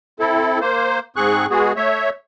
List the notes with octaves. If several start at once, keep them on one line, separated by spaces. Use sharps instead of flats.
C4 E4 A4
A#3 C5
G#2 C4 G#4 C#6 F#6
G#3 B3 F#4 G#4
A3 C#5 E5